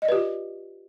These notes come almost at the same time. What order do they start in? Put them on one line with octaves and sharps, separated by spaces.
D#5 D5 B4 G4 F4